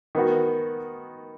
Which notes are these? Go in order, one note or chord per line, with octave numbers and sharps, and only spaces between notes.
D#3 B3 F#4